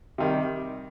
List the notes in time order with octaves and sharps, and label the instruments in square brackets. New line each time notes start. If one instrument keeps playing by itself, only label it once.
[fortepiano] C3 D#3 G3